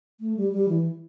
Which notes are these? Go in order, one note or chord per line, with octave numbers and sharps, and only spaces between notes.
A3
G3
G3
E3